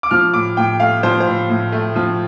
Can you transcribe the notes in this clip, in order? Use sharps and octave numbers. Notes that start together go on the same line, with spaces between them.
D6
F3 F6
A2 D6
A2 G5
A3 F5
F3 C5
C5
A2
A2
A3
F3